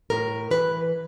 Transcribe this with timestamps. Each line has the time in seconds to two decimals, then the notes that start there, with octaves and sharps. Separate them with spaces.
0.10 A2 A#4
0.51 E3 B4